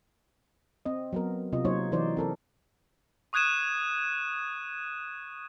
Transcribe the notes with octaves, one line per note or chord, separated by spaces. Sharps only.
C4 D#5
F#3 B3 A#4
C3 F4 D#5
F#3 A#3 D#4 C5 C#5
E3 D#4 C5 D5
C4 A4 A#4
C#6 D#6 F#6 G#6 D#7 E7